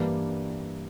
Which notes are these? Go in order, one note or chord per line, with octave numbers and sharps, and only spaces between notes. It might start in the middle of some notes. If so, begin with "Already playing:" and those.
Already playing: G2 E3 G3 A#3 D4